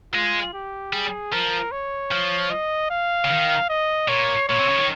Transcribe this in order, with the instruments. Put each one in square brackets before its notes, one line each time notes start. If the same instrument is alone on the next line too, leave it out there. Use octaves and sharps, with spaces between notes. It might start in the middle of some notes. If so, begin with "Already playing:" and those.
[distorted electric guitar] G#3 [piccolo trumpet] F4
[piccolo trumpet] G4
[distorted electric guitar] G3 [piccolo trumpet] G#4
[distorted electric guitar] F3 [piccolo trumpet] A#4
[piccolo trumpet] C#5
[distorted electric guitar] F3
[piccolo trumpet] D#5
F5
[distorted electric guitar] C#3
D#3
[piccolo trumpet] D#5
[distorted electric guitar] A#2 [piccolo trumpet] C#5
[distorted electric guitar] A#2 [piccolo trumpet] C#5
[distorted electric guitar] C3
C#3
D#3